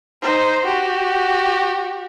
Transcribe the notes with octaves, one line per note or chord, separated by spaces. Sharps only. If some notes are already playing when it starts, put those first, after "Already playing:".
D#4 C5
F#4 G4